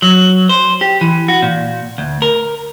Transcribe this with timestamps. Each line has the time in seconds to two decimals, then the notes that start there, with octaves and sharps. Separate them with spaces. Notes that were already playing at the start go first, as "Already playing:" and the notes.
0.02 F#3
0.49 C5
0.81 G4
1.01 E3
1.28 F#4
1.42 A#2
1.98 D2
2.22 A#4